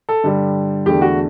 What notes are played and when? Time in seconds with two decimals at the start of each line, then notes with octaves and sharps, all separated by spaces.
0.09 A4
0.24 G2 D3 G3
0.86 E2 D3 A3 D4 G4
1.01 F#4